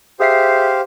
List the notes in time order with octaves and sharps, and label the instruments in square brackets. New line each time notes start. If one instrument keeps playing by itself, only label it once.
[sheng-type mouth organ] G4 C5 F5 [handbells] G#4 E5 C7